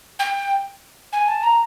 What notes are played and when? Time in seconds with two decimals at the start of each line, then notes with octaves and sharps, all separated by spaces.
0.19 G5
1.13 G#5
1.28 A5
1.43 A#5